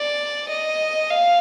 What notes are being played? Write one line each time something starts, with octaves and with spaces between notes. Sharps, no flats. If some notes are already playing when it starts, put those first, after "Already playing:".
Already playing: D5
D#5
F5